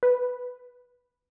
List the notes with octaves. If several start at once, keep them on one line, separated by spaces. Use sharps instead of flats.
B4